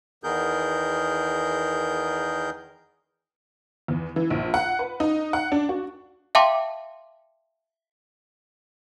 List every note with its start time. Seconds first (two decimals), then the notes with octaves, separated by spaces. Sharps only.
0.24 E2 D#3 B3 G#4 A#4 G6
3.88 E2
4.16 E3
4.30 A#1
4.54 F#5
4.79 B4
5.00 D#4
5.33 F#5
5.52 D4
5.69 F#4
6.35 E5 F5 G5 A5 C6 D6